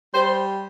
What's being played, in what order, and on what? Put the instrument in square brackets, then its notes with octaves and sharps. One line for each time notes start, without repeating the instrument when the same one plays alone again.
[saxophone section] G3 C5